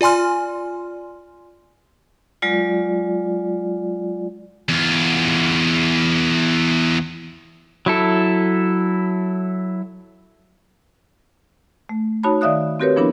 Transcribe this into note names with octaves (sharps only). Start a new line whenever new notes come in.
F4 D5 G#5 C6 F6
F#3 G#3 F4 D5
E2 F4
F#3 E4 A4
A3
D#4 F#4 C#5 A5 B5
D#3 D5 E5 F5 D#6 F#6
C4 F#4 G4 A#4 B4 C#5
F3 B3 D4 E4 A#4 B5